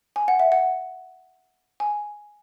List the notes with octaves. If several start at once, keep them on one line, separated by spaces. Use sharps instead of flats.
G#5
F#5
E5
F#5
G#5